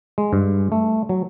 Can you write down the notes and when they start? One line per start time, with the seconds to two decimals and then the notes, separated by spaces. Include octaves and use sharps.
0.18 G#3
0.33 G2
0.72 A3
1.09 F#3